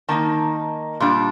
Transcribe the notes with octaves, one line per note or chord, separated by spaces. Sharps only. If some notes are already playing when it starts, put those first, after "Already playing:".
D#3 A#3 D#4 A5
A#2 G3 D4